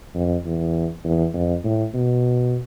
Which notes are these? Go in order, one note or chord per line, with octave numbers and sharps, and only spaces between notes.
F2
E2
E2
F2
A2
B2